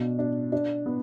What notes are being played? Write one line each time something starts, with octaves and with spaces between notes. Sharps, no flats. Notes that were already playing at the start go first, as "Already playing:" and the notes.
Already playing: B2 D4
D4
D4
B3